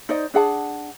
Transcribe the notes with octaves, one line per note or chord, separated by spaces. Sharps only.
D#4 C5 D5 D#5
D4 G#4 F#5 A5